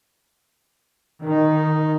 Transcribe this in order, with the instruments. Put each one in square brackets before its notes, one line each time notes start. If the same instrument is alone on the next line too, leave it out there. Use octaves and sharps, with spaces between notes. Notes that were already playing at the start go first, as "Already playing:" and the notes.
[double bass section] D#3 [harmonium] D#4